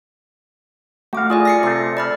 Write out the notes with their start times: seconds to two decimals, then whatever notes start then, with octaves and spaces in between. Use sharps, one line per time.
1.13 A3 F#4 F5 D6
1.30 F4 G#4 D5 G#5
1.45 A#6 C7 C#7
1.63 C3 A3 A#6
1.97 D5 B5 F6